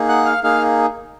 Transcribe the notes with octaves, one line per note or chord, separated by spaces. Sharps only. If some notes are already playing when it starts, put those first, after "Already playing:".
Already playing: A#3 D#4 G#4
F#5 F#6
F5 F6
A#3 D#4 G#4 F5 F6